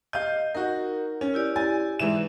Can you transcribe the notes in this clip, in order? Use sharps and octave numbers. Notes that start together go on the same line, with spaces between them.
D#5 F5 G6
D#4 F#4 A#4
C#4
E4 G4 D5
G#5 A6
G#2 E3 E5 E7